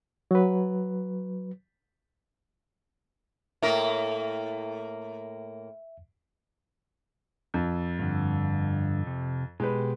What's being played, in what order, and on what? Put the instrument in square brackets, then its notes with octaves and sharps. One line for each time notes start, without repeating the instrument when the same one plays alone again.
[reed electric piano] F#3 B4
[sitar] A2 A#3 A#4 [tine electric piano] E5
[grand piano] F2
[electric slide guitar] G2 D3
C3
[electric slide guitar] B2 G4 [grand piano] G#3 B4